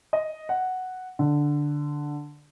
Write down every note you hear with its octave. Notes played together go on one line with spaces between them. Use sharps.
D#5
F#5
D3